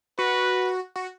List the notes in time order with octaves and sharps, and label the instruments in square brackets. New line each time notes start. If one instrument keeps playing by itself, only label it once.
[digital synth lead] F#4 [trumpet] B4
[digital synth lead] F#4